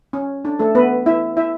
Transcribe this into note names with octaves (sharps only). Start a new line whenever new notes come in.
C#4
D4
A3 A4
B3 B4
E4 E5
E4 E5